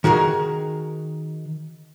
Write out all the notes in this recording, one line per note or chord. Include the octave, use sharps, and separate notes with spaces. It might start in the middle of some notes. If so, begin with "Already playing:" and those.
D#3 F#4 G#4 A#4